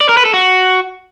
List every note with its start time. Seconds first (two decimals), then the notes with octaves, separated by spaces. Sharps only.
0.01 D5
0.09 A#4
0.17 B4
0.25 A4
0.34 F#4